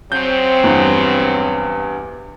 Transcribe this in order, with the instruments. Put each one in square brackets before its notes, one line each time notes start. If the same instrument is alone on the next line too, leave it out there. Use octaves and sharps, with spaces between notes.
[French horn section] C#3 F#3 C4 [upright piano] G6
[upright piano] E2 G2 B3